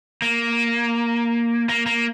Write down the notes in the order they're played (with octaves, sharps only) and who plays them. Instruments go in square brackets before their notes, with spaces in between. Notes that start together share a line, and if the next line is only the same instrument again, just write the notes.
[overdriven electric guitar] A#3
A#3
A#3